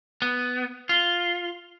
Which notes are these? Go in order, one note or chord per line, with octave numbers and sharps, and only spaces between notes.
B3
F4